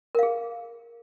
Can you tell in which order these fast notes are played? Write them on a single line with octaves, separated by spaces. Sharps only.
A#4 F5 G#4